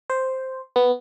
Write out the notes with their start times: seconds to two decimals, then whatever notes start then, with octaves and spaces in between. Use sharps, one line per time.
0.10 C5
0.76 B3